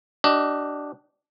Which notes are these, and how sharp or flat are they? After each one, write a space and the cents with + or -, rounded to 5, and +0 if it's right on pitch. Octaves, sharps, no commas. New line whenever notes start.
D4 +0 G4 -45 D#5 +5